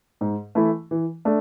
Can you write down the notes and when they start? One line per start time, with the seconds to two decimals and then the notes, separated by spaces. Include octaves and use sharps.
0.21 G#2
0.55 E3 A3 E4
0.91 E3
1.25 A3 D4